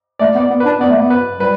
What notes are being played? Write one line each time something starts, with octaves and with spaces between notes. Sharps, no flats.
A3 D5
B3
D5
B3
B4
D4
B3 D5
A3
B3
B4
G3 B4